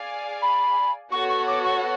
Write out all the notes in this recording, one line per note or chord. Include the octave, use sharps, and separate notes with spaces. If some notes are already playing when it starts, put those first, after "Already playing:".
Already playing: G#4 D5 F5 G#5
B5
B3 F#4 A4 C#5 C#6
C#6
D6
C#6